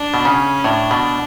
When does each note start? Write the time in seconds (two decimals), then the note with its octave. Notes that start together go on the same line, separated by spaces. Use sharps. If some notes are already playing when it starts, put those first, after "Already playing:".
Already playing: D4
0.14 B2
0.25 C#3 C#4
0.64 A2 D4
0.91 B2